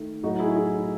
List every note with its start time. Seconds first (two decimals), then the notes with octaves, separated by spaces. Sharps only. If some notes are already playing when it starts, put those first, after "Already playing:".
Already playing: D#3 A3
0.23 A2 F#3 A3 D#4 F#4
0.39 E4 G#4
0.56 E4 G#4